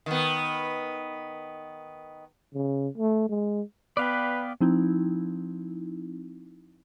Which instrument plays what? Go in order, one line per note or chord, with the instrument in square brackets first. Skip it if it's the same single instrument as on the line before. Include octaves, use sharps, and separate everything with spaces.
[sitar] D#3 B3
[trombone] C#3
A3
G#3
[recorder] B3 [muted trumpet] B4 [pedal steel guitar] D5 F5 G5
[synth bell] F3 C4 D#4 E4